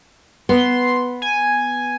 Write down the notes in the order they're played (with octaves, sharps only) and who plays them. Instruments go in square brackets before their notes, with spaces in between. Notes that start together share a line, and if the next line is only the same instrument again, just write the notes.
[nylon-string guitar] B3 [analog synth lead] C6
[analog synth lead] G#5